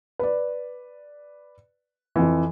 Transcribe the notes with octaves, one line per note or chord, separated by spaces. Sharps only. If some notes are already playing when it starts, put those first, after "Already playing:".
B4 D5
F2 E3